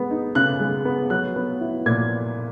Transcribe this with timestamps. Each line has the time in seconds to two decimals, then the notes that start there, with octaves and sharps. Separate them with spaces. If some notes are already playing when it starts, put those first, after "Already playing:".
Already playing: G#3 B3
0.11 D#4
0.35 C#3 F#6
0.60 G#3
0.85 B3
1.10 F#3 F#6
1.36 B3
1.61 E4
1.86 A#2 G#6